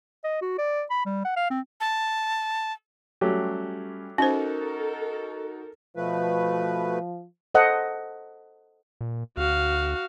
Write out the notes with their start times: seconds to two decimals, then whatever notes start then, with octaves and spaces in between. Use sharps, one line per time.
0.24 D#5
0.42 F#4
0.58 D5
0.90 B5
1.06 G3
1.25 F#5
1.37 F5
1.51 C4
1.80 A5
3.21 F#3 G3 A3 C#4 G4
4.18 C#4 D#4 F#4 A4 A#4 C5
5.97 B2 F3 A3 B4
7.55 A4 C5 D#5 F#5
9.01 A#2
9.37 D2 F#4 F5